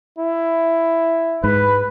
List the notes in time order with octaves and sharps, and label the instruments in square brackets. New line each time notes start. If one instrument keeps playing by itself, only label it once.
[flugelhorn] E4
[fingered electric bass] G#2 [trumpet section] B4